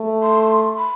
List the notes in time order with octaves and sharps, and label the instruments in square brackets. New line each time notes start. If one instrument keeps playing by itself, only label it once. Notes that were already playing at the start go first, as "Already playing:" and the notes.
Already playing: [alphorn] A3
[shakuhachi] C6
B5